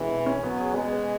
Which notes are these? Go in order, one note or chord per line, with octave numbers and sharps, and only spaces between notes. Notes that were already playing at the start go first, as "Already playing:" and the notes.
Already playing: B2 E3 G#3 C#4 F#4
B2
C#4
F#3 B3
G#4
G#3 B3
B4